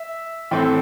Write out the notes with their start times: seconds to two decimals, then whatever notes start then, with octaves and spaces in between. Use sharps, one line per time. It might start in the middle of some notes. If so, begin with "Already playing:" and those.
Already playing: E5
0.51 A2 E3 A3 C4